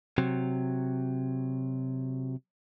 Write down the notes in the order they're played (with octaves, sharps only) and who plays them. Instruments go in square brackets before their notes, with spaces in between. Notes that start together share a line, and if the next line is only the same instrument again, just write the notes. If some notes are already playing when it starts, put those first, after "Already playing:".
[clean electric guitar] C3 F#3